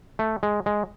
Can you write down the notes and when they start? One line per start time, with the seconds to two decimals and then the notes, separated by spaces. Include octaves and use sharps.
0.19 A3
0.43 G#3
0.66 G#3